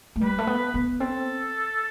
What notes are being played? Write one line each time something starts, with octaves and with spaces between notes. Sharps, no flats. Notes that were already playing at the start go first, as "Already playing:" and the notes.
A3
G3 B4
A3
B3
B3
C4 A4